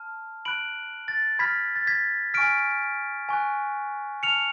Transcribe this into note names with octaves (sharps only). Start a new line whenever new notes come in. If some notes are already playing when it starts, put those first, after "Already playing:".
Already playing: A5 F6
B5 F#6 D7 F#7
A6
B5 F6 G#6 B6
A6
G#6 B6
G#5 C#6 F6 B6 D7
G#5 C#6 F#6
A5 F6 C#7 F7